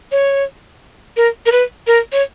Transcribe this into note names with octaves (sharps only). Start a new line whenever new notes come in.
C#5
A#4
A#4
B4
A#4
C#5